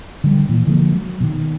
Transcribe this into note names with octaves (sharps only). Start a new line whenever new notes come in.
D3 G3
A#2 E3
D3 F3 G#3 A#3
F#3
B2 D#3